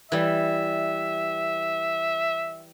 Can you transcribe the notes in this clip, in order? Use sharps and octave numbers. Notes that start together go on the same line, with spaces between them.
E3 G3 E5